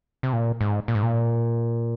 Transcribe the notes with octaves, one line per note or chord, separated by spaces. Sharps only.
C3
A#2
G#2
A#2
G#2
A#2